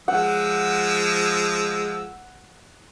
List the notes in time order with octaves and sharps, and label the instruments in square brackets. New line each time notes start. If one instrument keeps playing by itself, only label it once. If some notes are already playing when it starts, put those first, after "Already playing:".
[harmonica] F3 G#3 E6 [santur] F#5